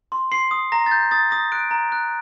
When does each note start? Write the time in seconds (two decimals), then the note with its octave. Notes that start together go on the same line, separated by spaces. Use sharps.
0.12 C6
0.32 C6 C7
0.51 D#6
0.72 A#5 A#6
0.86 A6
0.91 G6
1.11 D#6 A6
1.31 D#6 A#6
1.52 F#6 D7
1.71 A#5
1.92 F#6